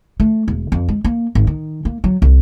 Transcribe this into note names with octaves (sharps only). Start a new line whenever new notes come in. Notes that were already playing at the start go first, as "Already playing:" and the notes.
A3
E1
F2
G#3
A#3
G#1
D#3
A#3
F#3
C2